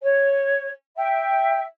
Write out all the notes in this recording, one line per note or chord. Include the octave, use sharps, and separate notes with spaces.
C#5
E5 G5